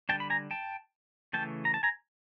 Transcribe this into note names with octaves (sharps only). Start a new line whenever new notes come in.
D3 G3 A#3 D4 G5 A5
B5
G#5 A#5
G5 A5
C#3 E3 A3 G5 A5
A#5
A5
G#5 A#5